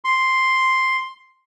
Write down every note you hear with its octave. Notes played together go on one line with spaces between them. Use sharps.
C6